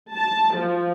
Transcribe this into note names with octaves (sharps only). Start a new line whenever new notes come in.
A5
F3